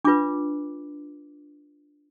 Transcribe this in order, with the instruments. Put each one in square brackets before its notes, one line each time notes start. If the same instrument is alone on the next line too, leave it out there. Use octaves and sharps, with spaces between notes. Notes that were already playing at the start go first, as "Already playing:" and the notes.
[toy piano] D4 F4 B4 D6